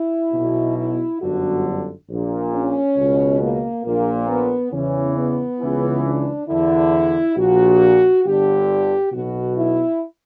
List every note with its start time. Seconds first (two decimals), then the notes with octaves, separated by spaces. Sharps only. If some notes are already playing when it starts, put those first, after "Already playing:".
Already playing: E4
0.32 B1 B2
0.76 E4
1.20 G1 F#2 D3 F#4
2.08 A#1 A#2
2.53 C#4
2.96 C#2 B2
3.40 A#3
3.84 A#1 A#2 A#3
4.28 B3
4.72 E2 C#3 E3 C#4
5.17 B3
5.60 C#2 C#3 E3
6.04 D4
6.47 E2 D3 E4
7.36 A#1 A#2 F#4
8.24 G1 G2 D3 G4
9.11 B1 B2 F#4
9.56 E4